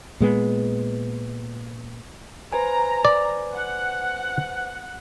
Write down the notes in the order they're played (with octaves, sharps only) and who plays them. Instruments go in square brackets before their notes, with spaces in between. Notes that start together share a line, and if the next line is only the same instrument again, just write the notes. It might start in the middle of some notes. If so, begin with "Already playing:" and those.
[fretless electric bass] A#2 G#3 B3
[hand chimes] B4 C5 G#5 [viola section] A#5
[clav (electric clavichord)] D5
[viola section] F#5